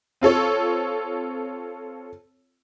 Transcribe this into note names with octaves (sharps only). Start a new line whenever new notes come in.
C4 F4 A4 C#5